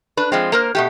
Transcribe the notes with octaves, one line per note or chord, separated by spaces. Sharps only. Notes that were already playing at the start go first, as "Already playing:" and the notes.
D4 B4
F3 G#3 C4
A#3 A#4 C5
B2 A3 G4